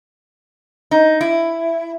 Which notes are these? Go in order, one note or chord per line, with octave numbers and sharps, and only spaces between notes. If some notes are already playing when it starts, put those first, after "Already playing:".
D#4
E4